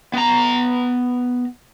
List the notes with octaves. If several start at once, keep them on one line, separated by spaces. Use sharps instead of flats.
B3 A#5